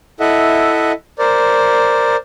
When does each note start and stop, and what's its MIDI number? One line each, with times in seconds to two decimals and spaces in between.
0.20 0.92 64
0.20 0.92 69
0.20 0.92 75
0.20 0.92 76
0.20 0.92 78
1.19 2.16 70
1.19 2.16 72
1.19 2.16 74